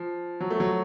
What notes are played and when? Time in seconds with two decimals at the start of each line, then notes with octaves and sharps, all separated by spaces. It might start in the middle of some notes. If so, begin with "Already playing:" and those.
Already playing: F3
0.41 F#3
0.50 A3
0.60 F#3